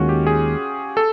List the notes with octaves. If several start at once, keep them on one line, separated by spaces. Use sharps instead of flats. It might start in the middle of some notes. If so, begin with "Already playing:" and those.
Already playing: D#2 D#3 G#3 C#4 F4 F#4
G4
G#4
A4